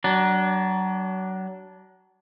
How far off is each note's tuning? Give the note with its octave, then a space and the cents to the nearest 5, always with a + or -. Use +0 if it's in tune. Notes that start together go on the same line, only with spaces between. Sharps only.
F#3 +30 D4 +0